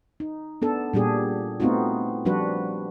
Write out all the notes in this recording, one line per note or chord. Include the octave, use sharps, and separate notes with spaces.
D#4
B3 D4 A4
A#2 G3 D4 G4 G#4
A3 B3 C4 D#4 F4 F#4
F3 G3 D4 F#4 B4